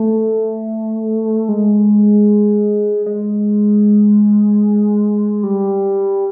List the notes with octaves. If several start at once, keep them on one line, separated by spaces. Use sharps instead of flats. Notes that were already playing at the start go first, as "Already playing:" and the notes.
Already playing: A3
G#3
G#3
G3